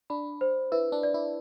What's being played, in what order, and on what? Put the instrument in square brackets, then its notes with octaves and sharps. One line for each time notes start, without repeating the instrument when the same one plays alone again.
[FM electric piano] D4 [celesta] B5
[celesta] C5
[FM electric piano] E4 [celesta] B4
[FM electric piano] D4
[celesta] D5
[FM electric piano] E4